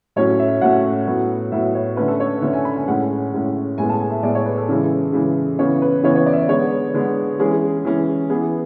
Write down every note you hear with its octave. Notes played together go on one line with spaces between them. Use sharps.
A2 F#3 A3 C#4 C#5
E5
A2 F#3 A3 C#4 F#5
A2 F#3 B3
A2 F#3 B3 E5
C#5
D3 A3 C#4 B4
A4
C#5
D3 A3 C#4 E5
G#5
B5
G#5
A2 G#3 C#4 F#5
A2 G#3 C#4
A2 G#3 B3 G#5
A5
G#5
E5
A2 G#3 B3 D5
C#5
B4
A4
C#3 E3 G#3
C#3 E3 G#3
C#3 E3 B3 C#5
B4
C#3 E3 B3 C#5
C#5
D5
E5
D5
D3 G#3 B3 C#5
D3 G#3 B3
E3 G#3 C#4 G#4
E3 G#3 C#4
E3 B3 G#4